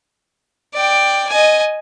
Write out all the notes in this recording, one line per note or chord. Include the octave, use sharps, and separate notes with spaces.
D5 G5
D#5 G#5